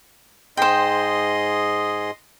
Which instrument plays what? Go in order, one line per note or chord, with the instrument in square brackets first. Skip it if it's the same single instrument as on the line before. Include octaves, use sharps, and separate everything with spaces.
[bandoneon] G#2 G#4 [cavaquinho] C5 G5 [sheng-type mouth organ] D#5 C6